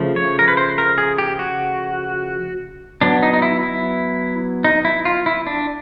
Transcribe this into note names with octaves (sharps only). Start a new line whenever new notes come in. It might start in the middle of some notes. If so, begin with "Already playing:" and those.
Already playing: C#3 F3 A3
C#5
A#4
B4
C5
A#4
G#4
G4
F#4
F#3 B3 D4
D#4
D#4
E4
E4
D#4
E4
F4
E4
D4